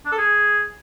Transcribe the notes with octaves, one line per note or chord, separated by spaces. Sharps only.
D4
A4
G#4